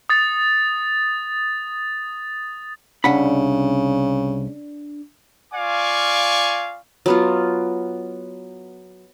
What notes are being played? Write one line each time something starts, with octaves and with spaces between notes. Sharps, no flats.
D#6 A6
C2 C#3 D4 F#5 B5
F4 D5 F5 G#5 C#6 D6
F#3 B3 F4